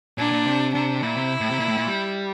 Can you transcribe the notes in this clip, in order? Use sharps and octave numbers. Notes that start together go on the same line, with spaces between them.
A#2 D4
A#2
C3
C3 D4
A#2 E4
C3
A2
C3
A#2
A2
A#2
G3